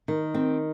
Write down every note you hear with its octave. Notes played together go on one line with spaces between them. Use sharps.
D#3
C4